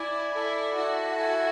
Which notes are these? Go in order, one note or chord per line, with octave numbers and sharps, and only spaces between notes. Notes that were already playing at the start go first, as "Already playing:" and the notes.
Already playing: E4 D5 G#5
E4 A4
E4 F#4
G#5